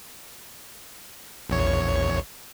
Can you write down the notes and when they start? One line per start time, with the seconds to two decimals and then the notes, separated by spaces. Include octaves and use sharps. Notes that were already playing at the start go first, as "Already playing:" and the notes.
1.50 A#1 E2 C#5